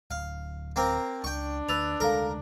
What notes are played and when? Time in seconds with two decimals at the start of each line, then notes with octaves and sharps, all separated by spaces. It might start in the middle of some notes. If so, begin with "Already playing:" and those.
0.11 D1 F5
0.76 A#3 C4 A#5
1.24 C#2 D4 G5 C#6
1.69 D2 B4 E6 A6 F7
2.00 D2 F#3 G#3 A4 A#4 F5 A#5